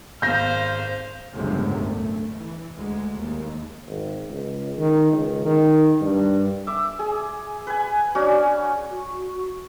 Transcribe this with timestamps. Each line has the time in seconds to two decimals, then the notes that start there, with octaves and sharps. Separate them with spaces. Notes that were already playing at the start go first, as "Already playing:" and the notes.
0.22 G#1 C5 F5 G6 A#6
1.34 G1 C#2 F#2 A2 C3 G#3
1.72 D2 A3
2.35 E3
2.77 D2 G#3
3.16 D#2
3.87 G#1
4.29 C#2
4.78 D#3
5.12 C#2
5.45 D#3
6.01 G2
6.67 E5 D6
6.99 G#4
7.67 B4 G#5
8.15 C#4 D4 F#4
8.91 F#4